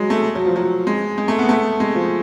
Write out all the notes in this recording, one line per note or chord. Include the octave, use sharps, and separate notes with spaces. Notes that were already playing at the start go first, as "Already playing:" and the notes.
Already playing: F#3 G#3
A3
F#3
F3
F#3
G#3
G#3
A3
B3
A3
G#3
F3